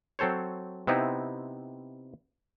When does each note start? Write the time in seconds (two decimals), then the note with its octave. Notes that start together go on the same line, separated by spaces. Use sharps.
0.19 F#3 C4 A4 C5 C#5
0.87 C3 B3 C4 D#4 E4